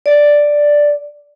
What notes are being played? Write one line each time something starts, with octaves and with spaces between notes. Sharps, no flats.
D5